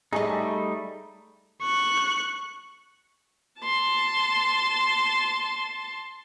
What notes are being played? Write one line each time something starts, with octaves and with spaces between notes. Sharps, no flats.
G3 A3 D#4 G#4 D#5
C#6 F#6
A5 C6